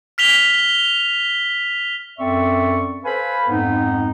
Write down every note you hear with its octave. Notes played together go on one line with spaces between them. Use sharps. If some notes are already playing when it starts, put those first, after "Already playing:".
F6 B6 F7 G7
F#2 C4 A4 D5 E5 C#6
A4 B4 C5 F5 G#5 B5
F2 G#2 G#3 B3 C4 D#4